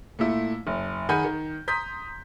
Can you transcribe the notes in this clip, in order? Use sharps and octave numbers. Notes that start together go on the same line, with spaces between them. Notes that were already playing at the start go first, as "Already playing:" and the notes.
A#2 A3 E4
F#1
D#3 G#4 F#5 G#5 B5 G6
D#3
A#5 C6 D#6 G6 B6